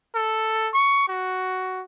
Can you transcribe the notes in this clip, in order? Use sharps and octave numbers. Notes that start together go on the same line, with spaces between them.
A4
C#6
F#4